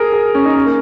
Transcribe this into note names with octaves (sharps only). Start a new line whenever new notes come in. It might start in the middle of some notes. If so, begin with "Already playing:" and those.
Already playing: G#4 A#4
G#4
C#4
D#4
C#4
A#3